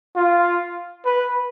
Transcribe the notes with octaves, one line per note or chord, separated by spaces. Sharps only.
F4
B4